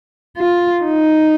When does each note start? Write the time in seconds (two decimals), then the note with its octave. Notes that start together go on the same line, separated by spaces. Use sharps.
0.37 F4
0.84 D#4